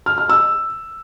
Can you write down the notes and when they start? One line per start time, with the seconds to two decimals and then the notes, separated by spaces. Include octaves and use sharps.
0.06 F6
0.18 F6
0.29 E6